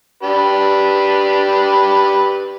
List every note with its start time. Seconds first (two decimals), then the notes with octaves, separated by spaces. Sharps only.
0.23 D4 G4 B4